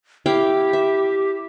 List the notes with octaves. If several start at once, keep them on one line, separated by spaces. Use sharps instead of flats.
E4 G4 F5 G5
E5